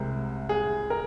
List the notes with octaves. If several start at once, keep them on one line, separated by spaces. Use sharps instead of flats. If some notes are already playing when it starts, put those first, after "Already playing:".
Already playing: C2 C3 G#3 A#4
G#4
A#4